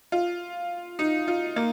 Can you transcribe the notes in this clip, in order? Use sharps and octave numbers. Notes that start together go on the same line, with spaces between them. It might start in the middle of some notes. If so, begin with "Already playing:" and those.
F4
D#4
F4
A#3